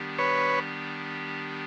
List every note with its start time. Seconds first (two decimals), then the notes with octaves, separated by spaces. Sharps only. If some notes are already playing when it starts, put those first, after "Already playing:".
Already playing: D#3 G3 B3 D4 G4
0.18 B4 C#5